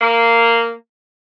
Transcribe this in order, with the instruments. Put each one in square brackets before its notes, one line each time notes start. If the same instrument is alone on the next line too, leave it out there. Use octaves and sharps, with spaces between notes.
[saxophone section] A#3